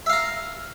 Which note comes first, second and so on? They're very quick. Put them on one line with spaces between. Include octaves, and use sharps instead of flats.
E5 F5 A#5